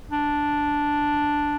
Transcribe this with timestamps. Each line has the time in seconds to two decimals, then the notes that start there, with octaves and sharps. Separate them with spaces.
0.12 D4